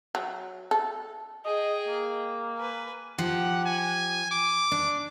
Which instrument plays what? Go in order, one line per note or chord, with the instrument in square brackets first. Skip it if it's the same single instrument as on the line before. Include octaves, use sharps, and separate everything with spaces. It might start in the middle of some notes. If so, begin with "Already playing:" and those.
[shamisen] F#3
A4
[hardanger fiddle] G#4 G5 [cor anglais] D#5
[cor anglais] A#3
[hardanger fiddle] B4 G#5
[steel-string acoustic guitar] F3 G4 [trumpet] F#5
[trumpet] G#5
D6
[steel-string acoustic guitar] D4